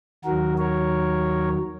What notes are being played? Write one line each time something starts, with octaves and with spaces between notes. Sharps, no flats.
D#2 D#3 F#3 F#4 A#4
A#4 C#5